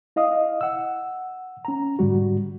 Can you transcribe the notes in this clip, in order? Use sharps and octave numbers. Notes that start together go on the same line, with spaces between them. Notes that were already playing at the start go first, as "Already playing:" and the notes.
E4 D#5 F5 D#6
F#5 E6
C#4 A#5
G#2 D3 G3 F#4